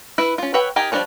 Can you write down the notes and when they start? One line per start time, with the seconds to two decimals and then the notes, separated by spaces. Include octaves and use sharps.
0.18 E4 B4 E5
0.38 C#4 F4
0.54 B4 C#5 E5 F#5 G5
0.76 D#4 G4 A#4 D#5 G#5
0.92 F3 G3 D4 G#4 C#5